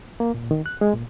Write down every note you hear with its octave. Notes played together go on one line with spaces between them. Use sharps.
A#3
A#2
D#3
F#6
G#3
A#2